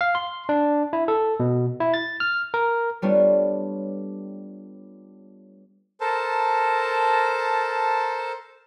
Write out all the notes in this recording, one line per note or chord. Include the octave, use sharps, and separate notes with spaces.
F5
C6
D4
E4
A4
B2
E4
A6
F6
A#4
G3 A3 B3 D4 F4 C#5
A4 A#4 C5 A5